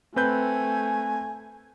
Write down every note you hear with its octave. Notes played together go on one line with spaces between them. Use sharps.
A3 C4 B4 G#5 G6